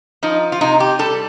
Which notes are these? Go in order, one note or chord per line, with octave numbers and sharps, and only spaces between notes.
F3 D#4
F4
C3 D#4
G4
G3 A4